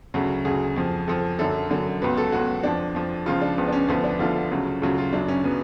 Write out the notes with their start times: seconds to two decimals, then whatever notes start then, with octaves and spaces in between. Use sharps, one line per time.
0.14 D2 C#3 F#3
0.45 D2 C#3 F#3 G#4
0.76 F2 F3
1.08 F2 F3 A4
1.39 F#2 D3 F#3 A4
1.70 F#2 D3 F#3
2.02 C#2 B2 F#3 B4
2.17 A4
2.32 C#2 B2 F#3 F#4
2.63 F2 F3 D4
2.95 F2 F3
3.26 C#2 C#3 F3 F4
3.42 D4
3.58 C#2 C#3 F3 B3
3.68 D4
3.72 C#4
3.88 D2 D3 F3 B3
4.04 D4
4.19 D2 D3 F3 F4
4.51 D2 C#3 F#3
4.82 D2 C#3 F#3 F4
4.98 F4
5.13 F#2 C#3 F#3 D4
5.28 C#4
5.44 C#3 F#3 B3